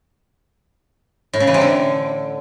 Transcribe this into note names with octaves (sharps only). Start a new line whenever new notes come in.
A2
C#3
E3
C3
D3